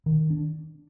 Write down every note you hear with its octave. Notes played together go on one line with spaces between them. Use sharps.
D#3
D4